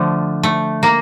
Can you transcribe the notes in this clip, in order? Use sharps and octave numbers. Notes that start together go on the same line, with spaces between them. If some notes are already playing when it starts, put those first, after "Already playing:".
Already playing: D3 F3 A3
A3
A#3